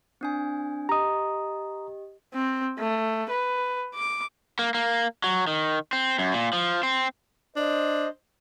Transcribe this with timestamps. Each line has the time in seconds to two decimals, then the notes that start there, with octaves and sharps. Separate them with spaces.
0.21 C4 D4 G#5
0.89 G4 D#5 A#5 D#6
2.34 C4
2.79 A3
3.30 B4
3.95 D6
4.59 A#3
4.74 A#3
5.24 F#3
5.47 D#3
5.93 C4
6.19 F#2
6.34 A#2
6.53 F3
6.83 C4
7.56 D4 C5 D#5